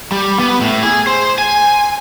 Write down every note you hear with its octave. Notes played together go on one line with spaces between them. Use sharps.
G3
B3
A2
G#4
C5
G#5